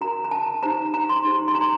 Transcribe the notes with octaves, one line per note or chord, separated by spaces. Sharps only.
F#4 A#4 A#5
A#5
A5
D#4 G4 C5 A#5
A#5
C6
D#4 G4 C5
C6
A#5